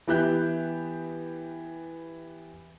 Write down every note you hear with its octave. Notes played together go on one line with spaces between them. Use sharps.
E3 B3 G4 E5 F#6 G6